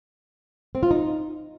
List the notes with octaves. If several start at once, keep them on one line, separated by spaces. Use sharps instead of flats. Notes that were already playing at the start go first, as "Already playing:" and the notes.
C4
F4
D#4